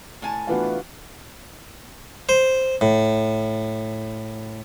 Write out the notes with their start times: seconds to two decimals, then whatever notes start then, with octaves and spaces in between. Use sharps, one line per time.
0.22 A2 G#5 A5
0.47 E3 A3 B3 D4 F4 F#4 B4 F5
2.29 C5
2.81 A2